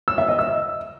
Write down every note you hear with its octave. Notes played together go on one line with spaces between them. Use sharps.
E6
E5
D#5
E6